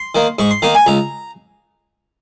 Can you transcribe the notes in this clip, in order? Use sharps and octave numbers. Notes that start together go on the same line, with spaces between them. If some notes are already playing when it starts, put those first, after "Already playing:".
Already playing: C6
D#3 A#3
G#2 C#6
C6
D#3 A#3 A#5
G#5
C#2 A#5